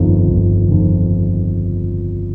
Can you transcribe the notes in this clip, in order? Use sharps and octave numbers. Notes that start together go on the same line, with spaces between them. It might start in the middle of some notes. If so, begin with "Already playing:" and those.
Already playing: G1 F2 D#3
G1
F2 D#3